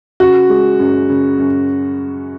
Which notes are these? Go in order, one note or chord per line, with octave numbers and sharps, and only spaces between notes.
C#3 F#4
G#3
F#2
C#3
F#2